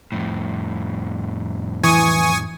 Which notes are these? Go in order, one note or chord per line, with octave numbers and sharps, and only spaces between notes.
F2 A2
E3 G#5 C#6 D#6